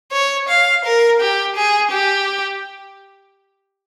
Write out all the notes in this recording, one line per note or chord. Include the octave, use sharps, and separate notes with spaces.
C#5
F5
A#4
G4
G#4
G4